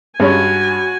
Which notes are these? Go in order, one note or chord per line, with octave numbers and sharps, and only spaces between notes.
G2 G#3 C#4 F#4 C#5 G#5